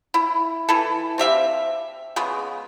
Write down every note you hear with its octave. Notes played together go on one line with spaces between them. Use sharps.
E4
E3 E4 A4
C4 G4 E5 F5
C#3 G#3 B3